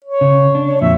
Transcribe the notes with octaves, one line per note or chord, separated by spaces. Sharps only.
C#5
C#3
D4
C#5
F2 A#2 E5